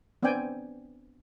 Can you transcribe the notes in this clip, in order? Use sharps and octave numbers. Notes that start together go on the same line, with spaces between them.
B3 C4 D4 D5 G5 G#5